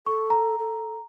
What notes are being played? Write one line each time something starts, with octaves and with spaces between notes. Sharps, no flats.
A4 C#6
A#5
A4